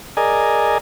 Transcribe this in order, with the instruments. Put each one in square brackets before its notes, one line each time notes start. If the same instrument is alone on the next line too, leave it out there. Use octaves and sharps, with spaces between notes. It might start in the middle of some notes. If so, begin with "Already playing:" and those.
[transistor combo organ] G#4 A#4 D5 D#5 G#5